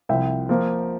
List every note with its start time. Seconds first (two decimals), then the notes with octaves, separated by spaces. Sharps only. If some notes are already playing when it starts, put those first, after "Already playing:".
0.09 C2 C3 F3 C4 E5 G5
0.49 F3 A#3